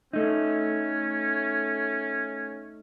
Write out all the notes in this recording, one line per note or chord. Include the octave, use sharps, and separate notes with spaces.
A3 C#4 D#4